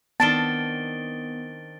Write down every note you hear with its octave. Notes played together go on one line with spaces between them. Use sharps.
D#3 B3 C4 D4 A5 A6 D7 G7